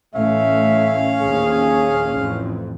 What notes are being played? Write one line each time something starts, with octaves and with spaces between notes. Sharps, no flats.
A1 A2 A3 C#4 E5 F5
A#1 D#2 G#4
A1 F2